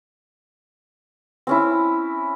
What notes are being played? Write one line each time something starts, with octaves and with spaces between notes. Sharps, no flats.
C4 C#4 E4